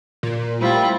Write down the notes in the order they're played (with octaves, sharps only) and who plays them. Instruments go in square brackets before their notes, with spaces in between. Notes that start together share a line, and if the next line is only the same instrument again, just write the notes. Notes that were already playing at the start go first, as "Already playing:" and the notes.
[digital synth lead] A#2
[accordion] G3 C4 [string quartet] A3 E4 F4